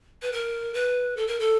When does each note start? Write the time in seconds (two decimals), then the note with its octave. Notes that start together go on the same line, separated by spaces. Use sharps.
0.22 B4
0.32 A#4
0.74 B4
1.17 A4
1.27 A#4
1.40 A4